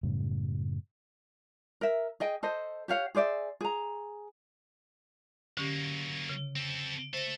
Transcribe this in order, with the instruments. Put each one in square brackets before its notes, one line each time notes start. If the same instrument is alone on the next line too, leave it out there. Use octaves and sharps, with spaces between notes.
[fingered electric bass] F#2 A2 C#3 G3
[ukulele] A#4 E5
G#4 D#5 G5
A4 C5 D#5
G4 C#5 F5 F#5
G#4 C5 D5 E5
G#4 A#5
[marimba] D3 C#4 G4 [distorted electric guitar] F#3 A#3
[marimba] C#3
[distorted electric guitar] C4 A4
[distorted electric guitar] A4 E5 [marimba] C5 A#6